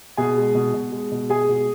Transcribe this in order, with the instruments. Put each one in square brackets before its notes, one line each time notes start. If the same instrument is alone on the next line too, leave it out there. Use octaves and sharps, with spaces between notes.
[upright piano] B2 G#4 G#5
G#3
B2
B2
G#3
B2
G#3 G#4 G#5
B2